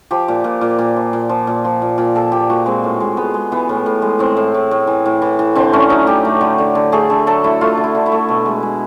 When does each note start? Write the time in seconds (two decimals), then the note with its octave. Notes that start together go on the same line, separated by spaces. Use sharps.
0.11 F3 G4
0.28 A#2
0.44 A#2
0.61 A#2
0.79 A#2
0.97 F3
1.13 A#2
1.29 F3
1.47 A#2
1.64 F3
1.82 A#2
1.98 A#2
2.15 A#2 A4
2.32 A#2 G4
2.50 A#2 F#4
2.66 G#3 C4
2.84 A2
3.00 G#3
3.17 G#3 B3
3.34 G#3
3.52 E3 B3
3.69 A2
3.86 A2
4.02 G#3
4.19 A2 C4
4.37 A2
4.54 A2
4.71 A2
4.87 E3
5.06 A2
5.22 E3
5.39 E3
5.55 D3 C4
5.73 A3 C#4
5.90 F#3 D#4
6.07 A3 G4
6.25 A3
6.41 D3
6.58 D3
6.75 D3
6.92 A3 G#4
7.10 D3 A4
7.27 F#3 A4
7.44 A3 E4
7.61 A3 F4
7.77 D3
7.84 E4
7.95 D3
8.06 E4
8.12 A3
8.29 B2
8.46 G#3
8.63 G#3